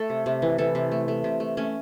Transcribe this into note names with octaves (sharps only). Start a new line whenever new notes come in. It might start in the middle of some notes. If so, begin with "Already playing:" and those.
Already playing: A3 A4
C3
C3
E3
E3 A4
C3
A3
A3
C3
A3
A3 C#4